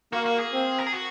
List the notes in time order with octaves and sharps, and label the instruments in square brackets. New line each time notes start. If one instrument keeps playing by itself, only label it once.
[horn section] A#3 [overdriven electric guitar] F#4
[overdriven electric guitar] F#4
G#4
[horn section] C4
[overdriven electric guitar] A#4
G#4
F#4